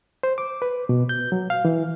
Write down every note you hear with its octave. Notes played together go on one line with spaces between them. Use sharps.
C5
D6
B4
B2
G6
F#3
F5
E3